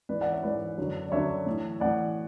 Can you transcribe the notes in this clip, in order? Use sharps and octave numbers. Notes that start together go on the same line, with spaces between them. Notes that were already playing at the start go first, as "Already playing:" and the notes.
G#2 E3 B4 D5
D5 F#5
C#5 E5
G#2 E3 B4 D5
F#2 D3 F#3
D5
F#2 D3 F#3 C#5 E5
A2 E3
A2 E3 D5 F#5